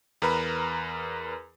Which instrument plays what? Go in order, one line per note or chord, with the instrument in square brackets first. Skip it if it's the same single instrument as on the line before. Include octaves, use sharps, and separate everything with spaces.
[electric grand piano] E2 A#4 B4 A#5 B5